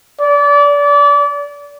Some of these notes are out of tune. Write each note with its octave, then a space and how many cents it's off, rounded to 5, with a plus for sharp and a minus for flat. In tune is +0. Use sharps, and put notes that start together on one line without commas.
D5 -30